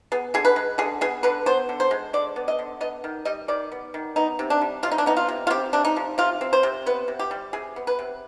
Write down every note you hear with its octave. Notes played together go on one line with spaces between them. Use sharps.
B3 G#4
D3 G#4
B4
G#3
D3 G#4
B3 G#4
D3 B4
B3 C5
D3
C5
G#3
D3 D5
B3
D#5
D3
B3 D#5
D#3
G3 D#5
D#3 D5
B3
D#3
B3 D#4
C3
D4
G3
C3 F4
D#4
D4
B3 D#4
F4
C3
F4
C4 G4
C3 D4
D#4
F3
C3 F4
C4
C5
C3
B3 B4
C3
G4
G3
C3 G#4
B3
B4
C3